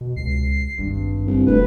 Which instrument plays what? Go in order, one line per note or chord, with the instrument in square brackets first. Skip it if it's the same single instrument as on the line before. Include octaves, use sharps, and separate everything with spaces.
[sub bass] B2
[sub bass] C#2 [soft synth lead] C7
[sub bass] G#1 [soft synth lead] G2
[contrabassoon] C2
[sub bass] E1 [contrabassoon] D2 [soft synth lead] B4